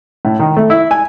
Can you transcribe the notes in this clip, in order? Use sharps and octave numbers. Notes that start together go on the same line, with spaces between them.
A2
D#3
A3
E4
G#5